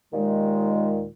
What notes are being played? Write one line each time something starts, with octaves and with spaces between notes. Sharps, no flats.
D#2 A#2 D#3 G#3